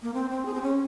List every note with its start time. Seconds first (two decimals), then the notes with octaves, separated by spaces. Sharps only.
0.02 A#3
0.14 C4
0.30 C4
0.46 G#4
0.54 C4
0.62 C#4